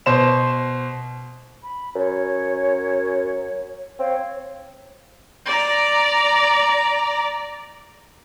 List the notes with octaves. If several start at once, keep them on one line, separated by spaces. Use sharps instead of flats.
B2 C5 E7
B5
F#2 C#5
C4 C#5 F5
D5 A#5